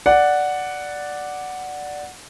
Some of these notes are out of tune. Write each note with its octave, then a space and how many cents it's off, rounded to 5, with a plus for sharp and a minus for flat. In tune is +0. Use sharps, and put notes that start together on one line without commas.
D5 +0 F#5 +0